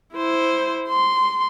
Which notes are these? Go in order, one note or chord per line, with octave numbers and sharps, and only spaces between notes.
E4 C5
C6